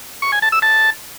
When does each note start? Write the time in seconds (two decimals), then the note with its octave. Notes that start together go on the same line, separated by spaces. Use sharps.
0.22 C#6
0.32 G#5
0.42 A5
0.52 E6
0.62 A5